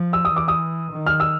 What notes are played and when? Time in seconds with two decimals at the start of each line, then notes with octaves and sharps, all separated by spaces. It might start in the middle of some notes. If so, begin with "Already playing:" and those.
Already playing: F3
0.13 E6
0.25 D#6
0.33 E3 D6
0.48 D#6
0.92 D#3
1.06 F6
1.20 E6